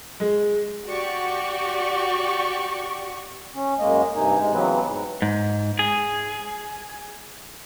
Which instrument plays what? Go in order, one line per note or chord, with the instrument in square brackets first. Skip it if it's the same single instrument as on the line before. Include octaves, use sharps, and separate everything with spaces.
[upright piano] G#3
[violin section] F#4 G4 D5 C#6
[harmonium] C#4
F#2 G#3 A#3 D#5
G2 C3 D#4 G#5
G#2 G#3
C#3 E3 F#3 B3 C4 B4
G#2
[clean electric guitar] G#2
G#4